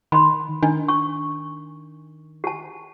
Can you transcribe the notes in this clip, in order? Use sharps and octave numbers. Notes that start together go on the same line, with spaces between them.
D#3 B5 C6
D#3 D4
C#6
G4 A5